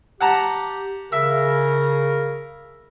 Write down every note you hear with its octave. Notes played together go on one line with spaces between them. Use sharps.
G4 F#5 A5 A#5
C#3 A#4 E5 E6